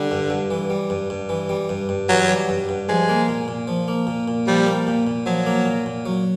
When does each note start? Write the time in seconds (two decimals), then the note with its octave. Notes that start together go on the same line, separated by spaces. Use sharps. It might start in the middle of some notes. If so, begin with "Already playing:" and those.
Already playing: D3 G3
0.11 G2
0.30 G2
0.51 E3
0.70 G3
0.90 G2
1.10 G2
1.29 E3
1.49 G3
1.69 G2
1.89 G2
2.09 E3 F#3
2.29 G3
2.49 G2
2.69 G2
2.89 F3 G#3
3.09 A#3
3.28 A#2
3.48 A#2
3.67 F3
3.88 A#3
4.07 A#2
4.28 A#2
4.47 F3 G3
4.66 A#3
4.87 A#2
5.07 A#2
5.26 F3 F#3
5.46 A#3
5.66 A#2
5.86 A#2
6.06 F#3